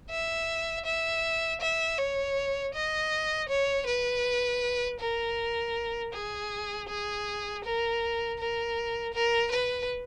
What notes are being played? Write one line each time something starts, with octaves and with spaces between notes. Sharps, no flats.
E5
E5
E5
C#5
D#5
C#5
B4
A#4
G#4
G#4
A#4
A#4
A#4
B4